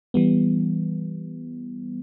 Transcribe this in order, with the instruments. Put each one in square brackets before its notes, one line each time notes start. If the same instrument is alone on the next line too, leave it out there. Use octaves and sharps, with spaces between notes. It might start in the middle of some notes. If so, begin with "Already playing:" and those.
[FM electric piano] E3 G3 B3